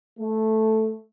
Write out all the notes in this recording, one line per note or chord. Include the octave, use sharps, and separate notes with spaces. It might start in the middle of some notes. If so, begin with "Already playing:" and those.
A3